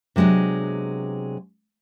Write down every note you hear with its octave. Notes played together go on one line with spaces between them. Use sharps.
C3 F#3 G#3 B3 D4